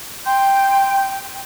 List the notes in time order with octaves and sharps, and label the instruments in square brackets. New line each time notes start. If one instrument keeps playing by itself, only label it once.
[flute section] G5 C6 G6